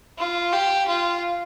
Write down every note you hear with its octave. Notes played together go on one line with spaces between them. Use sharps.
F4
G4
F4